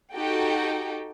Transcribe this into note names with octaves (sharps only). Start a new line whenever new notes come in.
D#4 F#4 G4 A4 G5